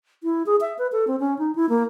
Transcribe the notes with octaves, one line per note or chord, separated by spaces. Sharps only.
E4
G#4
E5
B4
A4
C4
C#4
D#4
E4
A#3